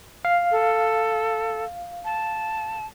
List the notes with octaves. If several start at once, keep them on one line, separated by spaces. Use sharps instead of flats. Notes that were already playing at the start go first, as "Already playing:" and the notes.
F5
A4
A5